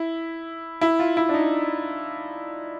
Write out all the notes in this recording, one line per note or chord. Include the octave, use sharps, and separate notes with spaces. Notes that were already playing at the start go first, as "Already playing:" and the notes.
Already playing: E4
E4
F4
E4
D4
D#4